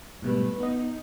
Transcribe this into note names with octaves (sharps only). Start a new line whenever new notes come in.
G#2 B2 G3 A3 B4
B3 D#4 D#5